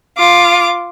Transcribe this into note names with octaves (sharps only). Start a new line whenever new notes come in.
F4 D6